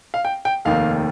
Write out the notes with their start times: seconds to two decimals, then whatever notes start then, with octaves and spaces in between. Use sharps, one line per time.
0.14 F5
0.25 G5
0.45 G5
0.65 F1 D#2 D#3 F5